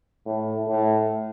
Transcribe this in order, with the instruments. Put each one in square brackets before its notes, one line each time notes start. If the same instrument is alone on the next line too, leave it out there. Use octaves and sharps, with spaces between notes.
[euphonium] A2
A2